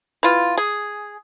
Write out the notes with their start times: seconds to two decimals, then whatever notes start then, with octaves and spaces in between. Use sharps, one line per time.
0.23 E3 F4
0.58 G#4